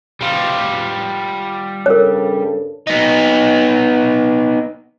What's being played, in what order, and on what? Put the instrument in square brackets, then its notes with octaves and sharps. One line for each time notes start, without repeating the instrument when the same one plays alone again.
[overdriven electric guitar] G3 F4
[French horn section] G2 C#3 A4 [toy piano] A#4 C#5
[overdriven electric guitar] B3 D#4